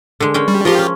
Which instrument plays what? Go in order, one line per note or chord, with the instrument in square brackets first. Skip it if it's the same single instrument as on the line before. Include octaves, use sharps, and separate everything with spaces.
[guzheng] D3 G#3
G#3 C#4 G5
[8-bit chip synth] G3
[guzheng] F3 A#5 C6 [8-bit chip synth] F4 G4
[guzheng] C#4